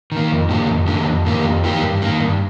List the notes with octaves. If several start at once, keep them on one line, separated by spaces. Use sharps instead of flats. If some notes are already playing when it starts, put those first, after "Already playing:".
D#3 A#3
F2
D#3 A#3 D4 G4
F2
D#3 A#3 D4 G4
F2
D#3 A#3 D4 G4
F2
D#3 A#3 D4 G4
G2
D#3 A#3
G2